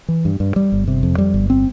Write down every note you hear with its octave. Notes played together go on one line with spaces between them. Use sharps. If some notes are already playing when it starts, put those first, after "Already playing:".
E3
G2
G2
G3
G1
C3
F2
G3
G1
C4